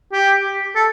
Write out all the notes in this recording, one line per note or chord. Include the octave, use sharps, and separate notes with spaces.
G4
A4